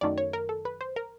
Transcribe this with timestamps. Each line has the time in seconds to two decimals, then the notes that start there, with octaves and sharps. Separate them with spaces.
0.01 F#2 D#3 F#3 A3 D5
0.18 C#5
0.33 A#4
0.49 A4
0.65 B4
0.81 C5
0.96 A#4